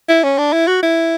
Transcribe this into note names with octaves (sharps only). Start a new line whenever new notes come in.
E4
C#4
D4
E4
F#4
E4